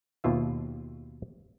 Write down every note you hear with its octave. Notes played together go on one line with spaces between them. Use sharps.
D#2 B2 F4 E5